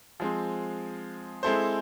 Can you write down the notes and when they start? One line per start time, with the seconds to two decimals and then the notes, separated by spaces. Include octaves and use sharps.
0.20 F3 G#3 C4
1.43 G#3 C4 E4 A4 C5